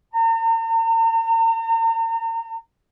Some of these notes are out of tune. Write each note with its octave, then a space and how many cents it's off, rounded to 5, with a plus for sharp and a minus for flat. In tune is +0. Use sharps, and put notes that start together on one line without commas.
A#5 -45